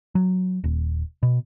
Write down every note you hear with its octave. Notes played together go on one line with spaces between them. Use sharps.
F#3
D#1
B2